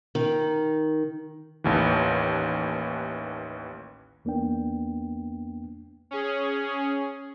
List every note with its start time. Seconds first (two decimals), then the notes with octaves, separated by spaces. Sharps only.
0.15 D#3
1.64 A1 D#2 E3
4.25 E2 A#3 B3 D4 G5
6.11 C#4 G#4